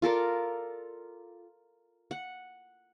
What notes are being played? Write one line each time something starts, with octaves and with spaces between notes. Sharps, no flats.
F4 A4 A#4 D5
F#5